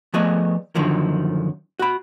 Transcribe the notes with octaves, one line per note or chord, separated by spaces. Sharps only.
F3 A3 B3 G#4 D5 D#5
F#2 D3 D#3 F3
F#4 B5